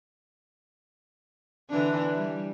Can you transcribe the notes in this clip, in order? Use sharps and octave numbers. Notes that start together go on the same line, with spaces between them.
D3 E3 D4
G3